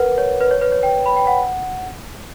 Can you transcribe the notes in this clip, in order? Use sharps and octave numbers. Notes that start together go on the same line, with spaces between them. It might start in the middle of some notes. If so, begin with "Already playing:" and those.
Already playing: A#4 B4 F#5
C#5
B4
C#5
B4
C#5
G5
B5
G5
F#5